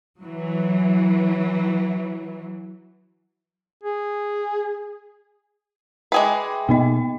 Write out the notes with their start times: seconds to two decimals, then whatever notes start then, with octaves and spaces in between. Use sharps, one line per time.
0.22 E3 F#3
3.84 G#4
6.12 G#3 G#4 B4 E5 G5 D6
6.69 B2 A#3 B3 D#4 D#5